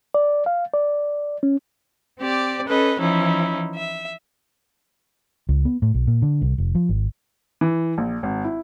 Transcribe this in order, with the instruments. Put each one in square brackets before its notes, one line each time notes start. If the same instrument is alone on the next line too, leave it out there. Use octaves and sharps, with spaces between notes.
[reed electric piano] D5
F5
D5
C#4
[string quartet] C4 G4 D5
C#4 A4 B4 D#5
E3 F3 C#4 D#4 E4
E5
[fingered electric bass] C#2
B3
A2
B1
A#2
D3
C2
F1
F3
G#1
[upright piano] E3
A#1
G#1
E4